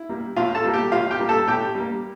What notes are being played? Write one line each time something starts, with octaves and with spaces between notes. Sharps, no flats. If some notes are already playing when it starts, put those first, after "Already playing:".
Already playing: E4
G3 A#3
A2 F4 F5
A4 A5
G3 A#3
G4 G5
A2 F4 F5
G4 G5
G3 A#3
A4 A5
A2 G4 G5
G3 A#3